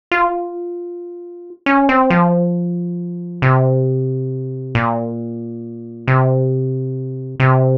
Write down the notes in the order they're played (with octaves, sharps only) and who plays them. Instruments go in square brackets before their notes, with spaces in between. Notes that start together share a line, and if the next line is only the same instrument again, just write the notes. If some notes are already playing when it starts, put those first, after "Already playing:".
[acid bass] F4
C#4
C4
F3
C3
A#2
C3
C3